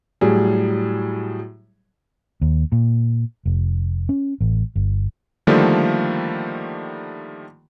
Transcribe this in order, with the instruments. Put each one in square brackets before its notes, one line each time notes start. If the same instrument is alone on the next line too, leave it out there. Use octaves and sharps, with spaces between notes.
[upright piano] A2 F#3 G3 G#4
[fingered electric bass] D#2
A#2
F1
C#4
A1
G1
[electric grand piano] D3 D#3 F3 G3 A3 A#3